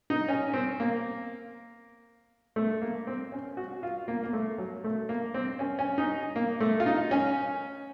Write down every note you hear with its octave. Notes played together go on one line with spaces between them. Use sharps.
D#4
C#4
C4
A#3
A3
A#3
C4
C#4
F#4
F4
A#3
A#3
A3
F#3
A3
A#3
C4
C#4
C#4
D#4
A#3
A3
F4
D#4
C#4